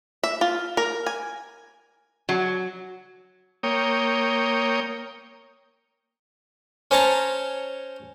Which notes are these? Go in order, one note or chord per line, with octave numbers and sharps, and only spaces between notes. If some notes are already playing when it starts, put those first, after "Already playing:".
E5
F4
A#4
G#5
F#3
A#3 C#5 G5 D#6
C#4 C5 C#5 A5 A#5